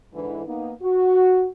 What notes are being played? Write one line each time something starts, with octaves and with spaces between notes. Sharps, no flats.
G#2 D3 E3
A#3 B3 D#4
F#4